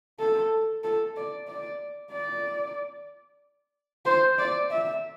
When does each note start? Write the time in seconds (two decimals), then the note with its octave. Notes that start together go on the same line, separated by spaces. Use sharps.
0.19 A4
0.84 A4
1.16 D5
1.48 D5
2.12 D5
4.05 C5
4.39 D5
4.70 E5